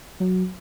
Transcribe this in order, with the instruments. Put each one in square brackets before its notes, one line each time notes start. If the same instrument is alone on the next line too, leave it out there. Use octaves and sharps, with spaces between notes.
[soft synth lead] F#3